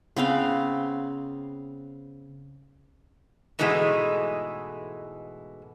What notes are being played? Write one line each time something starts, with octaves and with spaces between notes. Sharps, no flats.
C#3 B3 C4 F5
G#2 B2 E3 G#3 A3